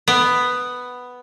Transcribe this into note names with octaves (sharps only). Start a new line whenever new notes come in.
B3